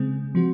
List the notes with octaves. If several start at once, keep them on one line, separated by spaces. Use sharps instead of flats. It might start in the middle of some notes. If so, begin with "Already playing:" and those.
Already playing: C#3 G#3 C4
F3 C4 F#4